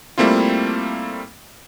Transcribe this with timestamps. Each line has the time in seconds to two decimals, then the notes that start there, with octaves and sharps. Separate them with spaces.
0.18 G3 A3 A#3 C4 E4 F4